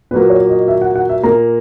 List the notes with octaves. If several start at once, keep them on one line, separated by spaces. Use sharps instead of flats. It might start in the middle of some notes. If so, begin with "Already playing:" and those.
A#2 F#3 A#3 B4
C#5
D#5
E5
F#5
F#5
E5
A#2 A#3 A#5